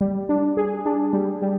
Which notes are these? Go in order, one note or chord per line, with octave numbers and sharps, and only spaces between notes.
G3
D4
G#4
D4
G3
G3